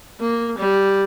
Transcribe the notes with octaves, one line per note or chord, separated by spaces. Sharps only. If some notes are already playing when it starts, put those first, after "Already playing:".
A#3
G3